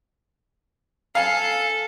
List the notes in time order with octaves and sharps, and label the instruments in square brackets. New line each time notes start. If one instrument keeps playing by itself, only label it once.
[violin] A4 [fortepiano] F5 G#5